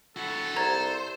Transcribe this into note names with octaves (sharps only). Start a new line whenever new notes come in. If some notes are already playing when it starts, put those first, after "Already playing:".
E4 F#4 A4
C2 C5 A#5 G#6 A6